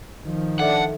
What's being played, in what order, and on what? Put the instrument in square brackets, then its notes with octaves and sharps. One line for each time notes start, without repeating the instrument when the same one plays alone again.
[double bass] D#3 F3
[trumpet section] D4 [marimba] A4 E5 [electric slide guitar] F#5